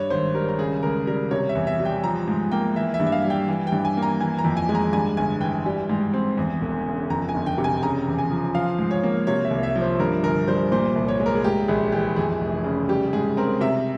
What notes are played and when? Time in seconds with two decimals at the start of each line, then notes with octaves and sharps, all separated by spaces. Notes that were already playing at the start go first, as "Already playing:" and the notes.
Already playing: G2 C#5
0.10 G#1 C5
0.34 G3 A#4
0.49 A#4
0.59 C#3 G#4
0.83 C#2 A#4
1.07 G3 A#4
1.31 C3 C#5
1.49 E5
1.55 E2
1.67 E5
1.80 G3
1.85 G5
2.04 F3 A#5
2.28 G#2
2.52 A#3 G5
2.76 E3 E5
2.94 E5
3.00 G2
3.06 E5
3.12 F5
3.25 G3
3.30 G5
3.48 E3
3.67 G5
3.72 G2
3.85 G#5
3.97 A#3
4.02 A#5
4.20 E3 G#5
4.38 A#5
4.44 F2
4.57 G#5
4.69 G#3
4.75 A#5
4.93 G2 G#5
5.17 G1 G#5
5.41 E3 G5
5.66 G3
5.90 G#2
6.13 C4
6.37 E2
6.61 E1
6.86 C#3
7.10 F2 A#5
7.29 G#5
7.34 G1
7.46 G5
7.58 C3
7.64 G#5
7.83 C#3 A#5
8.07 E2
8.18 G#5
8.30 F3
8.54 F3 F5
8.79 G#2
8.91 C#5
9.03 A#3
9.27 C3 C#5
9.45 E5
9.51 C2
9.63 E5
9.76 F3
9.81 C5
9.99 G2 A#4
10.23 G1 A#4
10.48 G3 C5
10.72 A#2 C5
10.95 C2
11.08 C#5
11.20 G#3
11.26 A#4
11.35 G#4
11.44 G#2 G4
11.68 A#1 G#4
11.92 E3 G4
12.16 F2 G#4
12.41 F1
12.64 C#3
12.89 G3 G4
13.13 G#2 G#4
13.37 C4 A#4
13.61 C3 E5